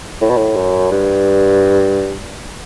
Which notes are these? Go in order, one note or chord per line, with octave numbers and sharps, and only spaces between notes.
A2
B2
A2
F#2
G2